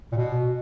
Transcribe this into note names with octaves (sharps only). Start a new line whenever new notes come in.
A#2
B2